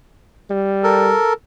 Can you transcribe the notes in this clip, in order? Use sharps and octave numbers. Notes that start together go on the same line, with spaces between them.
G3
A4 A#4